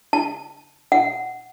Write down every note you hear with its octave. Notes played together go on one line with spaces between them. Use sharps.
A5
F#5